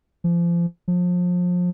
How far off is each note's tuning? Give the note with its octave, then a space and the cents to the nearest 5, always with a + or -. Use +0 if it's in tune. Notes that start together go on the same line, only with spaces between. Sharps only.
F3 -30
F3 +30